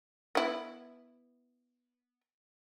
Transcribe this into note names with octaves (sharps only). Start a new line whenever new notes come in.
B3 E4